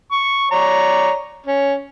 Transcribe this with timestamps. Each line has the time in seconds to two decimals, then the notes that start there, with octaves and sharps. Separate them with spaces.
0.12 C#6
0.51 C#5 D5 A#5
1.46 C#4